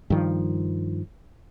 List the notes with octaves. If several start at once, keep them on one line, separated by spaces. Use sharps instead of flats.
G2 D#3 F3